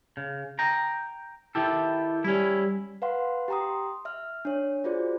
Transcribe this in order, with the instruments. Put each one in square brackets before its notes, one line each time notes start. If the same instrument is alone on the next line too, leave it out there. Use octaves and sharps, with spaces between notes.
[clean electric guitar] C#3
G5 A#5
[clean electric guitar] D#3 G4 A4 [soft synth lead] E4
[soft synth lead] G3 [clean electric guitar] C#4 E4
[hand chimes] B4 F5 F#5 C6
G4 G5 A#5 C6 D#6
E5 F6
D4 C#5
F4 F#4 G#4 C5 D5